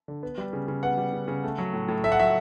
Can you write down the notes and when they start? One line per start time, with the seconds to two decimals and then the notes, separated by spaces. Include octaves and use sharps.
0.08 D3
0.23 B3
0.38 G3
0.53 C#3
0.68 C#3
0.83 B3 F#5
0.98 G3
1.13 C#3
1.28 C#3
1.44 A3
1.58 F#3
1.73 A2
1.88 A2
2.04 A3 E5
2.12 F#5
2.19 F#3 E5